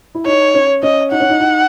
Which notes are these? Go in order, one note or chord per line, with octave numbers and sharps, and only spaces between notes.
E4
D#4 C#5
C#4
C#4 D#5
D#4 F#5
C#4
D#4
D#4